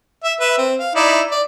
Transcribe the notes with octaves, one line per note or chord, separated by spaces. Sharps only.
E5
B4 E5
C4
F5
D#4 E4 D5
D5